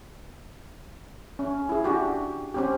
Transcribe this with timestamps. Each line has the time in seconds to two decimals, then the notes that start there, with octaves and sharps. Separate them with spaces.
1.39 C#4
1.69 E4 G#4
1.84 D4 F#4 G4
2.54 C4 C#4 G4